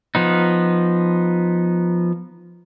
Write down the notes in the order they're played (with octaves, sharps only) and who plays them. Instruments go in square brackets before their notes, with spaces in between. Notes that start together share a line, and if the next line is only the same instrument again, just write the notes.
[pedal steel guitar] F3 B3 D#4